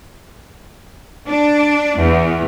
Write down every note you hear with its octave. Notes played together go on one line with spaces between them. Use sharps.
D4
E2